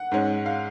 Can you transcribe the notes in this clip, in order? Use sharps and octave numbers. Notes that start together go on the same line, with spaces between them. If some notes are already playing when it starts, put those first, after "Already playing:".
Already playing: F#5
G#2 G#3 C#4
F5